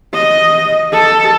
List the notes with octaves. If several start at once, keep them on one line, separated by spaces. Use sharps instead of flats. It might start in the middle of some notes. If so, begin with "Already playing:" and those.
D#5
A4